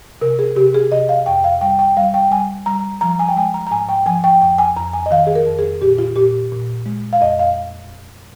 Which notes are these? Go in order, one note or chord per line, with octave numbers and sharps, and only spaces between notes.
C3 A#4
G#4
C3 G4
G#4
C3 D#5
F5
F2 G5
F5
G3 G5
G5
G3 F5
G5
G3 G#5
G3 A#5
F3 A#5
G#5
G5
G#3 G#5
A#5
A#5
G#2 G#5
G5
F3 G#5
G5
F2 G5
G#5
F2 A#5
G#5
D#5
D#3 F5
G#4
A#4
F2
G#4
A#2 G4
F4
A#2 G4
A#2
G#3
F5
F2 D#5
F5